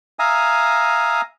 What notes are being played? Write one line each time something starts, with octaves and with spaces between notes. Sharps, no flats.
E5 F5 G#5 A#5 D#6